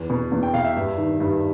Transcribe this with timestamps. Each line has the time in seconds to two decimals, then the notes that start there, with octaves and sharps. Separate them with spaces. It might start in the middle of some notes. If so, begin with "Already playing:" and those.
Already playing: E2
0.10 B2
0.32 E2
0.43 G5
0.54 B2 F5
0.64 E5
0.76 G2
0.98 D#3
1.20 G2